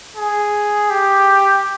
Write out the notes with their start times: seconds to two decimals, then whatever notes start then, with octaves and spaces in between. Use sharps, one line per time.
0.17 G#4
0.90 G4